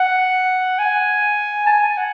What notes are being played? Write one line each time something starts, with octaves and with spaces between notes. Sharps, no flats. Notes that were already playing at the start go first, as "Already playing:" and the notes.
Already playing: F#5
G#5
A5
G#5
F#5